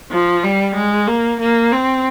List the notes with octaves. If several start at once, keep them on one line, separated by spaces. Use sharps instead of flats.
F3
G3
G#3
A#3
A#3
C4